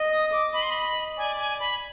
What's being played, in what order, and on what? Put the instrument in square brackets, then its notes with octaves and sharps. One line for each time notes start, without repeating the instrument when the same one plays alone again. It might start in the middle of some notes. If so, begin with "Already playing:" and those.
Already playing: [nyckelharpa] D#5
[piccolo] D#6
D6
[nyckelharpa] D#5 [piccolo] B5
[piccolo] C6
B5
[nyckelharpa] D5 [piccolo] G#5
[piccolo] G#5
B5